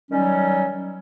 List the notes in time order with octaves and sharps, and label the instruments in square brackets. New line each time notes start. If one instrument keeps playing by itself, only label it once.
[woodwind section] D#3 F#3 G3 C#4